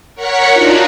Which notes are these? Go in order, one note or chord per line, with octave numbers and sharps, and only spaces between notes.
A#4 C#5 F#5 B6 C#7
D4 D#4 F4 F#4